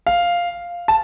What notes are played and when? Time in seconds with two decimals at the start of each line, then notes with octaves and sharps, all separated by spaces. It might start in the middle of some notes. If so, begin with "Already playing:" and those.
0.07 F5
0.88 A5